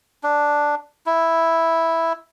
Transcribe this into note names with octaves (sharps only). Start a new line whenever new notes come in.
D4
E4